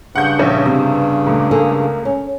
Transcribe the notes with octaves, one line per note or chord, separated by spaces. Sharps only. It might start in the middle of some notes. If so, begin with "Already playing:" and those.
G2 C#3 F#5 C#6 G6
A#1 C#4 E5
C3 B3
C#2 A3 D6
A#3 G#4 A4
C#4